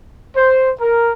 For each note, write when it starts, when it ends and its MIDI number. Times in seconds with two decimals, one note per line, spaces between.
0.35 0.71 72
0.80 1.11 70